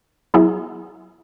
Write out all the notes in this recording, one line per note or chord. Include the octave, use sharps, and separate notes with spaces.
F#3 B3 E4 G#4